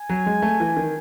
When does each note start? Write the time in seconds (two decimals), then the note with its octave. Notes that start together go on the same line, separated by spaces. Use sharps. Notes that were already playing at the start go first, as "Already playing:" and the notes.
Already playing: G#5
0.09 F#3
0.26 G#3
0.42 A3
0.60 E3
0.77 D#3